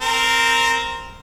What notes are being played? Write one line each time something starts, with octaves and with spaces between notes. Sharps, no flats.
C4 A#4